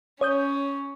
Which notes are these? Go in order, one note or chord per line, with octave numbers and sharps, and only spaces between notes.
C#4 C#5 D#6 G6